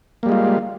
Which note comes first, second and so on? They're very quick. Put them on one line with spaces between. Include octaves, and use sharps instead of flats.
A#3 G3 G#3 F4